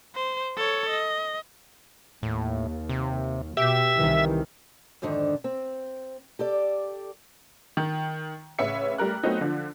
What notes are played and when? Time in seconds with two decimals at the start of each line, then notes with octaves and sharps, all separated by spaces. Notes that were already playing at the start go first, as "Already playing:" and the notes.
0.15 C5
0.57 A4 C#5
0.90 D#5
2.23 D#2 A2
2.89 C3
3.57 B2 G4 E5
3.95 C2 D#3 E3
5.02 F2 G#2 D3 D#3 D4
5.44 C4
6.39 G4 A4 D5
7.77 D#3
8.59 A1 C#3 C#4 B4 E5 C#7
8.98 G3 A3 A#4 F#6
9.23 F#3 A3 B3 C4 D#4
9.41 D3 F3